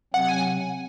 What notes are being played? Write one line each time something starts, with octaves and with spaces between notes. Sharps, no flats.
C3 F#3 C4 F#5
G#5